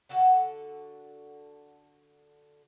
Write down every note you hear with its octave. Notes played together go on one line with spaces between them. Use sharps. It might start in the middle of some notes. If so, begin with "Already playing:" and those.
D3 F#4 A4 F#5